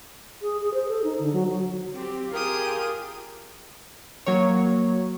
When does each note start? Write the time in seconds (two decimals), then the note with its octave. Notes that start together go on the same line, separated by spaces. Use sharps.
0.41 G#4
0.60 G#4
0.74 C5
0.88 A4
1.04 D#4
1.18 D3
1.32 F#3
1.49 F#3
1.94 C4 G4
2.33 F4 G4 G#4 A#4 D#6
4.26 F#3 A#3 C#5